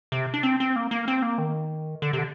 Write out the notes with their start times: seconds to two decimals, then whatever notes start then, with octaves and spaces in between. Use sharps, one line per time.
0.12 C3
0.34 D4
0.43 C4
0.60 C4
0.76 A#3
0.91 A#3
1.08 C4
1.22 A#3
1.38 D#3
2.02 D3
2.13 C3
2.18 D3